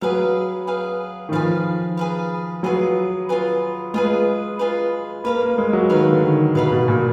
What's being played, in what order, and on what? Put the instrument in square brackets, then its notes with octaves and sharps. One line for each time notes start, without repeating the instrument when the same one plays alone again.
[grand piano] F#3 [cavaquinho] G#4 B4 F5
[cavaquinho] G#4 B4 F5
[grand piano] D#3
[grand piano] F3 [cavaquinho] G#4 B4 F5
[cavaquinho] G#4 B4 F5
[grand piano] F#3 [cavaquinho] F4 G#4 B4
[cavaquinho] F4 G#4 B4
[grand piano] G#3 [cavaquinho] F4 G#4 B4
[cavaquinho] F4 G#4 B4
[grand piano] A#3 [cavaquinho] B4 F5 B5
[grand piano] A#3
G#3
F#3
[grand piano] D#3 [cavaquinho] B4 F5 B5
[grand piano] D3
D#3
[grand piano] B2 [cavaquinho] B4 F5 B5
[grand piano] B2
A#2